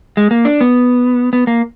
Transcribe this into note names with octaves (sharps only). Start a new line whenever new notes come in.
G#3
A#3
D4
B3
B3
A#3